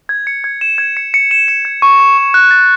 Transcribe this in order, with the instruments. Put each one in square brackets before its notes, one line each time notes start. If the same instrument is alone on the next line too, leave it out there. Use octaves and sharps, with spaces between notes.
[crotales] G#6
C#7
G#6
E7
G#6
C#7
C#7
E7
C#7
G#6
C#6
C#6
C#6
F#6
A6